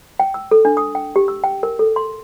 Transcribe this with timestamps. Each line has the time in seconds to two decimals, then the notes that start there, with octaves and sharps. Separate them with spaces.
0.20 G5
0.34 E6
0.51 A4
0.65 D4
0.77 D#6
0.95 G5
1.16 G4
1.28 E6
1.44 G5
1.63 A#4
1.79 A4
1.96 C6